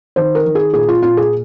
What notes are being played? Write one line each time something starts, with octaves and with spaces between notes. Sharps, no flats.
D#3 C5
A#4
D#3
G#4
A#2 G#4
F4
A#2 F4
G#4